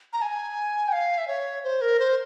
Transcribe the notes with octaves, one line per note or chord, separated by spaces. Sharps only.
A#5
G#5
G5
F5
E5
C#5
C5
A#4
C5